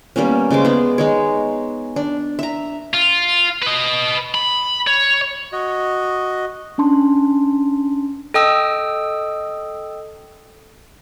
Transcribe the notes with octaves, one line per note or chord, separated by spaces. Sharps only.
G3 A#3 B3 C#4
C#3 G#3 C5 D6
B3 G#4
G#3 D#4 C#5
D4
E5 A#5
F4
B4 D#5
B5
C#5
F#4 D#5
C#4 D4 A5 C6
A4 D#5 G5 D#6 E6